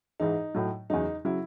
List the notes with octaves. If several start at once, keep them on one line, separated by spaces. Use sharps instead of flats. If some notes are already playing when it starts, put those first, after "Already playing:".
G#2 E3 D#4
A2 F#3
E2 C#3 F#3 D#4
C#3 F#3 E4